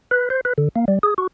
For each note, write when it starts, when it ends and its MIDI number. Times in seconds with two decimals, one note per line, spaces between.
0.11 0.29 71
0.30 0.41 72
0.45 0.53 71
0.58 0.69 50
0.76 0.85 58
0.88 0.99 55
1.03 1.14 68
1.18 1.27 66